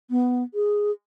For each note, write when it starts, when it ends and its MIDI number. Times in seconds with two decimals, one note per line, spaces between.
0.10 0.43 59
0.54 0.91 68